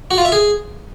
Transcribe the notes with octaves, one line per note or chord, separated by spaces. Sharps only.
F#4
F4
E5
G#4